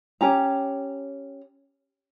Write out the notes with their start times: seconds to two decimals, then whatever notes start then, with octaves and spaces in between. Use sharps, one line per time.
0.21 C#4 G4 A#5